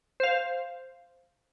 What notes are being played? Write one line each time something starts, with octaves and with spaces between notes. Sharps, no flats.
C5 F5